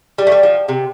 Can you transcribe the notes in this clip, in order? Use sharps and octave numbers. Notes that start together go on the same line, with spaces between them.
G3
A3
G3
F3
C3